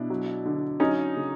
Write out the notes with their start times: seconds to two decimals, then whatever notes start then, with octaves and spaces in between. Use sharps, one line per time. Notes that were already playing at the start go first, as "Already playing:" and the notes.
Already playing: B2 D4 E4
0.10 F#3
0.45 D3
0.80 F#3 C#4 D#4
1.16 C#3